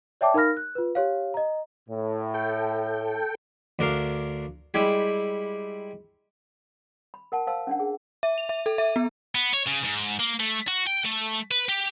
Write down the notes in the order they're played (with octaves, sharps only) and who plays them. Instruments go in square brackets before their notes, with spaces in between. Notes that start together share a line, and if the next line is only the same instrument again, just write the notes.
[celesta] C#5 D5 E5 G5 A5 D6
D#4 A#4 F5 B5 F6 A#6
F#6
F4 B4
G4 C#5 F5
D#5 A#5
[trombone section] A2
[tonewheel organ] A4 G5
[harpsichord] D2 D4 A#4 F5
G3 G#3 E4 G4
[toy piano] B5
A#4 F#5 A5
C5 F5 A5 E6
C#4 D4 F#5
G#4
[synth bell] E5
F7
E5
A4
E5
B3
[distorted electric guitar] B3
C#5
C#3
G#2
A#3
A3
F#4
G5
A3
B4
G4